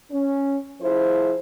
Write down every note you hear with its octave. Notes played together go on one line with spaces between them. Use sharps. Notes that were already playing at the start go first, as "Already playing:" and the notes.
C#4
F3 E4 G#4 C5